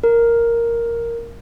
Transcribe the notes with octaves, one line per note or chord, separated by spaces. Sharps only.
A#4